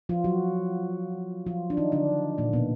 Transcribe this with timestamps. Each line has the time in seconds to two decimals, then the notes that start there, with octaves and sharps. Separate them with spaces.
0.09 F3 F4
0.24 F#3 F#4
1.47 F3 F4
1.70 D4
1.77 D#3 D#4
1.92 D3 D4
2.38 A#2 A#3
2.53 B2 B3